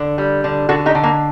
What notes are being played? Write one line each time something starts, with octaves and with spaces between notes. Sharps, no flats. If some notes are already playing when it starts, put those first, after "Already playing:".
Already playing: D3
G3
D3
D3 F#4 A4
D#4 G4
D3
A#3